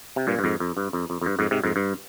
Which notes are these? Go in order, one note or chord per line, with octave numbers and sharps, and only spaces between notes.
C3
G2 A#2
G2
F2 G#2
F2
G2
F2
F2
F2
G2
F2 G#2
G#2 C3
F2 G#2
G2